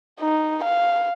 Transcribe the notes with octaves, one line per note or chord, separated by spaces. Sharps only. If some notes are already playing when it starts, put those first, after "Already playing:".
D#4
F5